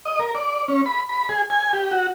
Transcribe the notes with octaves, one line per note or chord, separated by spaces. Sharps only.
D#5
A#4
D5
C#4
B5
B5
G#4
G#5
G4
F#4